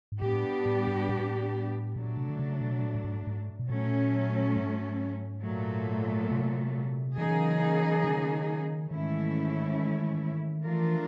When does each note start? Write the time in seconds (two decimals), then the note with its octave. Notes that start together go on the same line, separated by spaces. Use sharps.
0.12 G#2
0.22 A2 G3 B3 D4 G4
0.66 A2
0.87 G#2
1.09 A2
1.96 A#2 F#3 A3 D4
2.17 C3
2.30 D3
2.39 C#3
2.61 B2
2.83 A#2
2.95 A2
3.05 G#2
3.27 G#2
3.59 B2
3.69 A#2 F#3 A3 C#4
4.57 G#2
5.44 A#2 F#3 A3
6.31 C3
7.18 C#3 E3 F#3 A#3 D#4 G#4
8.04 D#3
8.91 G#2 D#3 E3 A3 C#4 E4
10.65 E3 F3 A3 D4 F4 A#4